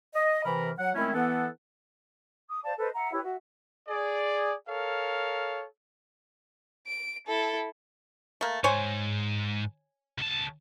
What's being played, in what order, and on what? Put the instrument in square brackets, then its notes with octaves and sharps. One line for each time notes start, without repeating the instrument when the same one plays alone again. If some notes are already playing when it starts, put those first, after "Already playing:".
[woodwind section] D#5
C3 E3 A#4 B5
F#3 F#5
D#3 G#3 A3 C4 C#4 E4
E3 B3 A4 F#5
[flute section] D6 D#6
C5 D5 F5 A5
A4 B4 C5 D#5
E5 F#5 A#5
E4 G4 B4 C#5
F#4 E5
[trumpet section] G#4 D5
A4 A#4 C#5 F5
[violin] D7
E4 A4
[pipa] A3 A#3
[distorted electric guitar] G#2 [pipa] C5 C#5 G#5
[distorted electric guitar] C#2 A5